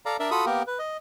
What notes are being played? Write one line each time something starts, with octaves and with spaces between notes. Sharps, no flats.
A4 D5 F5 A#5
D4 A#4 D5 E5
F4 F#4 A4 B5 D#6
A#3 B3 G4 A#4
B4
D#5